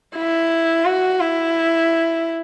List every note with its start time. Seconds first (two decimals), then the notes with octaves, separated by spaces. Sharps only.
0.16 E4
0.85 F#4
1.20 E4